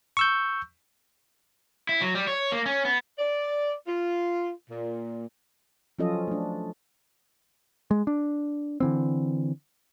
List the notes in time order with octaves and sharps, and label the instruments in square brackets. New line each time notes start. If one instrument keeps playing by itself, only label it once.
[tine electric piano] C#6 E6 G6
[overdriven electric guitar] E4
F#3
G3
C#5
A#3
C#4
B3
[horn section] D5
F4
A#2
[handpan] F3 F#3 C#4 F4 A4 D#5
A3 D4
[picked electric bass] G#3
D4
D3 E3 C4